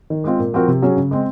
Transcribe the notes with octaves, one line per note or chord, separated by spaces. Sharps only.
D#3
G#3 C4 F4
A#2
F3 C4 F#4 A#4
C3
F#3 C#4 G#4
C#3
G#3 C4